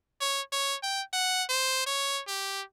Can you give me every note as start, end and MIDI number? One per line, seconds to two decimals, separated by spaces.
0.21 0.41 73
0.52 0.76 73
0.83 1.01 79
1.13 1.43 78
1.49 1.85 72
1.87 2.22 73
2.28 2.62 67